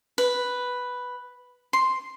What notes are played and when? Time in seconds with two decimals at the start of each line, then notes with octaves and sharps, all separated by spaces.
0.18 B4
1.73 C6